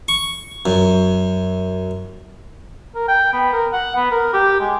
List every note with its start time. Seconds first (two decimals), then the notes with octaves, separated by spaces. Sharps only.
0.08 C#6
0.66 F#2
2.95 A#4
3.08 G5
3.33 B3
3.53 A#4
3.72 F#5
3.96 B3
4.11 A#4
4.33 G4
4.60 G#3